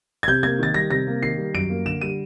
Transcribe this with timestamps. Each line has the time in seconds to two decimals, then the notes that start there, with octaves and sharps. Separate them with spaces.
0.23 G#6
0.28 C3 G6
0.43 A#3 G#6
0.59 D#3 A6
0.74 G3 A#6
0.90 C3 A#6
1.07 A#3
1.22 D#3 C7
1.38 G3
1.54 F#2 D7
1.70 A#3
1.86 D3 E7
2.01 G3 D#7